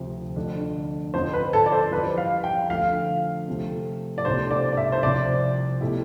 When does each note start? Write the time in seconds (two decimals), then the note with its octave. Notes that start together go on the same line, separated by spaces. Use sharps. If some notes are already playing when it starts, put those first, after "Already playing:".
Already playing: D2 C3 F3 C4
0.36 F2 D3 A3 D4
1.14 F2 D3 F3 C5
1.33 B4
1.53 A4
1.66 D5
1.72 C5
1.91 F2 E3 G3 B4
2.18 F5
2.44 G5
2.70 D3 F3 A3 F5
3.48 C3 F3 A3
4.18 D5
4.25 C2 B2 A3 D4 G4 C5
4.51 D5
4.72 D5
4.77 E5
4.92 C5
5.03 C2 C3 F3 D5
5.81 B2 A3 E4 G4